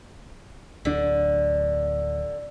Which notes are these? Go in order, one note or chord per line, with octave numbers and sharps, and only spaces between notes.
D1 D3 D4